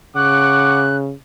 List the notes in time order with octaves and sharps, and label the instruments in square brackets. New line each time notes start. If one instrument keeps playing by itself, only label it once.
[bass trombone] C#3 [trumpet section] F#5 C#6 D6 [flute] F#6